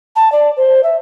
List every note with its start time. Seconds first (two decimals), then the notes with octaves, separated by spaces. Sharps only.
0.16 A5
0.32 D5
0.57 C5
0.83 E5